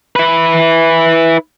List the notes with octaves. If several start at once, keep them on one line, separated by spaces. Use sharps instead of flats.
E4 B4